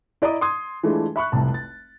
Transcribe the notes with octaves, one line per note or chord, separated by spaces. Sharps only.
E4 D5 D#5 A#5 D#6
C6 D#6 G#6
E3 G#3 A3 D4 E4 F4
E5 B5 C#6 F#6
F1 C2 A5
A6